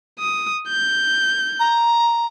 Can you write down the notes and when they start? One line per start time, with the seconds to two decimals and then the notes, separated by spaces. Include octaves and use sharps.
0.19 D#6
0.68 G6
1.59 A#5